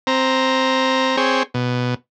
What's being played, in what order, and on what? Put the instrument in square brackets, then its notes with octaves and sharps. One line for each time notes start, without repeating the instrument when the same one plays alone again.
[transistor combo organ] C4 A#5
C4 G#4 C#5 G5
B2